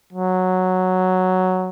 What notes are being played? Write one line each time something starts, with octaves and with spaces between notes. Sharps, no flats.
F#3